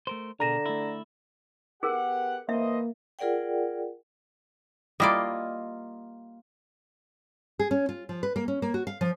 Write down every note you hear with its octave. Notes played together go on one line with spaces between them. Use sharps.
A3 A#4 C5
B2 D3 G#4 A#4 A#5 A#6 E7
A3 E4
B3 G4 G#4 A#4 F#5
E3 A#3 C5 D#5 E5
F4 G#4 A#4 D5 F#5 G5
G3 A#3 E4 F4 D5 D#5
G#4
C#4
F4
F3
B4
A#3
C#4
A#3
F#4
F5
F3